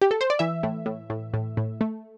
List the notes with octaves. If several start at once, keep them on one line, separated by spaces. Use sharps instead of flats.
G4
A4
C5
D5
E3 E5
A2
A2
A2
A2
A2
A3